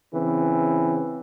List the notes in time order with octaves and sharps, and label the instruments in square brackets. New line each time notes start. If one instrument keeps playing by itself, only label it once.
[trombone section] C#3 E3 C4